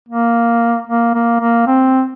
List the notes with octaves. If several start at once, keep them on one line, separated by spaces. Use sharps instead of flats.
A#3
A#3
A#3
A#3
C4